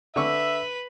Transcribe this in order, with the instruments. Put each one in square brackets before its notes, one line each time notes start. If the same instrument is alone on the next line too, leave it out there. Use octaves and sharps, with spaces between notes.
[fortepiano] D3 C#6 E6 [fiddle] B4 [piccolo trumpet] E5